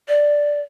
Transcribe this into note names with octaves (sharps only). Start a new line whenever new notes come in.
D5